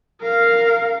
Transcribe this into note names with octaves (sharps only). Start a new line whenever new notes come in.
A#4 F5